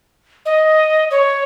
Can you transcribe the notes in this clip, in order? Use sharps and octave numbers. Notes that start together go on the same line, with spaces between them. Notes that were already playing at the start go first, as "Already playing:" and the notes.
D#5
C#5